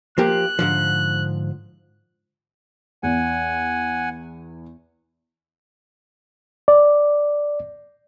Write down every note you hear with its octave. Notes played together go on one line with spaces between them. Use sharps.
F3 A#3 G4 F#6
G#2 D3 F3
E2 F#5 G#5
D5